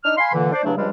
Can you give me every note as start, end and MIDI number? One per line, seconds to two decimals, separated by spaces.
0.04 0.16 62
0.04 0.16 63
0.04 0.16 75
0.04 0.16 89
0.17 0.31 77
0.17 0.31 80
0.17 0.31 83
0.17 0.31 84
0.33 0.49 46
0.33 0.49 50
0.33 0.49 52
0.52 0.62 62
0.52 0.62 72
0.52 0.62 74
0.64 0.72 40
0.64 0.72 43
0.64 0.72 49
0.64 0.72 54
0.64 0.72 57
0.64 0.72 62
0.77 0.89 37
0.77 0.89 43
0.77 0.89 53
0.77 0.89 55
0.77 0.89 56